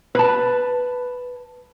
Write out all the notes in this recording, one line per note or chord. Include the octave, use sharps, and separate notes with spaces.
B4 A5